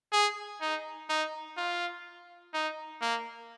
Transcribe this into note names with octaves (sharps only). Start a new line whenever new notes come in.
G#4
D#4
D#4
F4
D#4
A#3